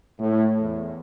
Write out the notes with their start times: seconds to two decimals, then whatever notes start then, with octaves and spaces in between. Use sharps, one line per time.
0.19 A2
0.60 E2